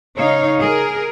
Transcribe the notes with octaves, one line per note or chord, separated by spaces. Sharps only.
C#3 D#4 C#5 F5
G#4 A#4